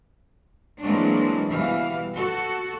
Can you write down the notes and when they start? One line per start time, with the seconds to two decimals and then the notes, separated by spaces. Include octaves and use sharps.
0.82 E3 F#3 G#3 A#3 C4 D4
1.49 B2 E3 G3 F5
2.15 F#4 A4